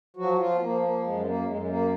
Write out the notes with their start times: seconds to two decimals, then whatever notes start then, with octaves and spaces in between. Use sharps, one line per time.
0.17 F3 F#3 F#4
0.38 F3 F4
0.55 B3
0.60 F3 A#3
0.82 A#3
1.03 F#2 G#3
1.19 B3
1.25 A#3
1.46 F#2 G#3
1.62 G#3
1.68 A#3